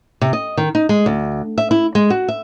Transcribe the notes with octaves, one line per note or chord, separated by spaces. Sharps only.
C3
D#5
D#3
D#4
G#3
D2
E5
E4
G#3
F#4
E5